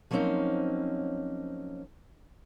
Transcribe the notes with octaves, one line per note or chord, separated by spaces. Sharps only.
F3 F#3 A#3 C4 C#4 D#4